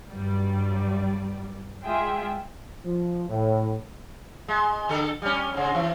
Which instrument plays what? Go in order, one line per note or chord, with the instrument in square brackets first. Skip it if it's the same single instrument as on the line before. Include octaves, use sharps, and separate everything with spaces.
[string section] G2 F#3 G3 D5
G#3 F4 G#4 E5 G5
[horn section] F3
A2
[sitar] G#3
D3 A4
G3 C#4
G#2 C#3
E3